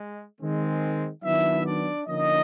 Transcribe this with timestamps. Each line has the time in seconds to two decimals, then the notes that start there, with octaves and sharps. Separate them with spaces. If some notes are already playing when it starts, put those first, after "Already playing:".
Already playing: G#3
0.41 D#3 G#3 C4
1.24 D#3 F#3 B3 D4 E4 E5
1.65 D4 D5
2.07 D3 F3 A#3 C#4 D#4 D#5